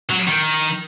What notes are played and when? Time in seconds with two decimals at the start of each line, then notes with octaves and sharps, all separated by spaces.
0.10 F#3
0.28 D#3